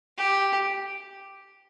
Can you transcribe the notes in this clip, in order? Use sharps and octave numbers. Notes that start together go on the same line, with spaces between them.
G4